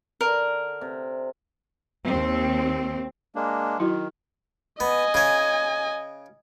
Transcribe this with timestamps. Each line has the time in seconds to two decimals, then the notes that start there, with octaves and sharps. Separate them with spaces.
0.21 D3 A#4
0.81 C3
2.06 D#2 C4
3.36 G#3 A#3 D4
3.79 D#3 F#3 E4 F#4
4.80 B3 D#5 G#5
5.14 C#3 C#4